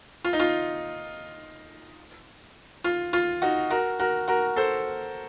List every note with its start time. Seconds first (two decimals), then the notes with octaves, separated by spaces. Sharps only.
0.25 F4
0.33 D#4
0.40 F4
2.84 F4
3.13 F4
3.42 D#4 F#4
3.70 F#4 A#4
4.00 F#4 A#4
4.28 F#4 A#4
4.57 A4 C5